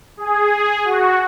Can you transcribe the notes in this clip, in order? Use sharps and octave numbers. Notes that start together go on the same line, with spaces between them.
G#4
F#4